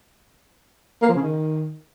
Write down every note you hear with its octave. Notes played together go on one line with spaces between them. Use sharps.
A#3
F3
C#3
D#3